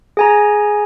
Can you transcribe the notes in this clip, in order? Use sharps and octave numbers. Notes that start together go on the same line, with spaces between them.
G#4 G#5 A#5